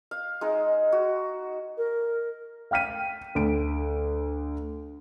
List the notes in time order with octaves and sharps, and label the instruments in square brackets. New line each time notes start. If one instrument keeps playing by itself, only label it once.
[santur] F5
G#3 D#4 D#5
F#4
[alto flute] A#4
[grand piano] F5 G5 F6 B6 D#7
D2 D7